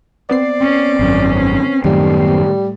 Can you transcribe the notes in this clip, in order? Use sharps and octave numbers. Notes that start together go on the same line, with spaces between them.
B3 C4 D5 C7
C#4
G#1 F#2 C#4
F#2 A2 D#3 G3